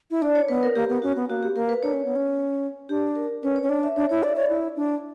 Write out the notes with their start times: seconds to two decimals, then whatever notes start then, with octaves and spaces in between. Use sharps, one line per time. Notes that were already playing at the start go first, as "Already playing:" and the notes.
0.11 E4
0.22 D4 D5
0.35 C#5
0.48 B3 B4
0.63 A#4
0.75 A#3 G4
0.89 B3
1.02 C#4 F#4
1.16 B3
1.29 A#3 F#4
1.43 G4
1.55 A#3 A#4
1.69 B4
1.83 D4 C#5
1.93 C#4
2.05 B3
2.16 C#4
2.89 D4 G4
3.16 A#4
3.43 C#4 B4
3.56 C#5
3.62 C#4
3.69 D4 D5
3.83 E5
3.96 D4 C#5
4.09 E4 C#5
4.23 D5 E5
4.36 C#5 D5
4.49 E4
4.76 D4